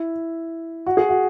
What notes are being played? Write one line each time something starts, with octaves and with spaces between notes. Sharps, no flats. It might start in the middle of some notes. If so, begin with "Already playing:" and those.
Already playing: E4
F#4
G#4
F#4